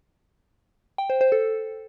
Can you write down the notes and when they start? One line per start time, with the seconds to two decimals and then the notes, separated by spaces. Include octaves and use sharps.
0.98 G5
1.10 C5
1.21 C5
1.32 A4